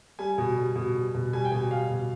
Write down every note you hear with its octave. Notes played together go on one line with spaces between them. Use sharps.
G3 G#5
B2
G3
B2
G3
B2
G3 G#5
G5
B2 G#5
G3 F5
B2